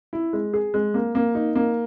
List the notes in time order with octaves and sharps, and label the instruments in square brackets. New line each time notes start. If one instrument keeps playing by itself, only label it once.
[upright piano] E4
G#3
G#4
G#3
A#3
A#3
D#4
A#3